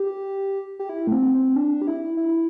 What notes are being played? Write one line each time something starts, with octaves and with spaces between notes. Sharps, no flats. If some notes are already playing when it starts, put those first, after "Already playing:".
Already playing: G4
G4
E4
A3
C4
C4
D4
G4
E4
E4